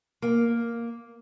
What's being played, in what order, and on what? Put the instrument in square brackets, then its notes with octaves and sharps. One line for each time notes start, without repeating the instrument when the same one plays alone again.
[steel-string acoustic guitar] A#3